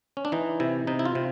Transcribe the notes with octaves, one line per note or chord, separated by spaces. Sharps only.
C#4
D4
E3 D#4
C3 E4
C3 D#4
E4
F4
C3